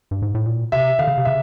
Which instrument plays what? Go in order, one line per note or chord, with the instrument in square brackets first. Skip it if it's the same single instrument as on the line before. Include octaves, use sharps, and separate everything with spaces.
[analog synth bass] G2
G#2
A2
A#2
[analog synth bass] C3 [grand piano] E5
[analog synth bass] D3 [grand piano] F5
[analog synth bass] C#3
C3
[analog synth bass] C#3 [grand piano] E5